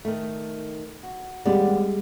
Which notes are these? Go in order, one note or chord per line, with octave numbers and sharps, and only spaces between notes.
D#3 A3
F#4
D#2 G3 G#3 B3 D5